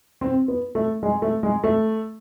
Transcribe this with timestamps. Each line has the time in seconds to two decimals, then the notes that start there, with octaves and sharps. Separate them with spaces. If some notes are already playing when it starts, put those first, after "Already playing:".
0.21 C4
0.48 B3
0.75 A3
1.03 G#3
1.22 A3
1.43 G#3
1.64 A3